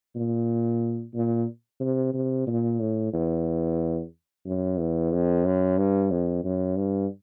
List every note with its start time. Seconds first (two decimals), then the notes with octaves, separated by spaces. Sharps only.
0.16 A#2
1.15 A#2
1.80 C3
2.14 C3
2.47 A#2
2.80 A2
3.13 E2
4.46 F#2
4.79 E2
5.12 F2
5.45 F#2
5.78 G2
6.11 F2
6.44 F#2
6.77 G2